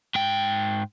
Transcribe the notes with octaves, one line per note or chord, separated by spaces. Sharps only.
G#2 G5